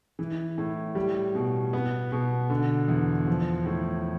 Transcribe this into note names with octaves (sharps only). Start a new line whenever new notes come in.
E3
A2
G3
B2
B3
B2
D3
E2
F3
A2